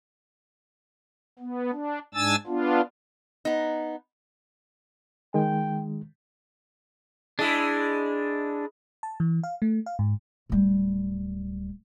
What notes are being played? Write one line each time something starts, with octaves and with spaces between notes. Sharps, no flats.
B3
D4
G#2 D4 G#5 E6 A6
B3 D4 F4
B3 D#4
D#3 G#3 G5
G#3 D4 E4
A5
E3
F5
A3
F5
G#2
D1 G3